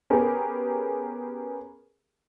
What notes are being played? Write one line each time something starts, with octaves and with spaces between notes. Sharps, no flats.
B3 C#4 G4 G#4 A#4